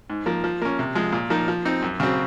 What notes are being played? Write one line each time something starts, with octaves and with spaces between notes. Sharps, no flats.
G#2
F3 A#3
F3
A#3 C#4
C3
F3 G#3
A#2
F3 A#3 D#4
F3
C4 D#4
F#2
C#3 F#3 C4